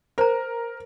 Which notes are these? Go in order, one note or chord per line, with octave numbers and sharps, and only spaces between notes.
A#4 C5 A#5